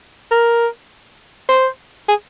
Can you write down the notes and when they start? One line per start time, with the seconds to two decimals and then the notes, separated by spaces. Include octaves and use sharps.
0.31 A#4
1.49 C5
2.08 G#4